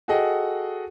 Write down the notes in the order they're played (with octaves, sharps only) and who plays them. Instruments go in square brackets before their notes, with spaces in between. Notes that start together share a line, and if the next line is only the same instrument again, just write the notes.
[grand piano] F#4 G#4 A4 D#5 F#5 G5